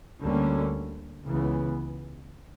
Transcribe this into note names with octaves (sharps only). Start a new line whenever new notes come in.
D2 D3 G3 A#3 C#4
C#2 C#3 E3 B3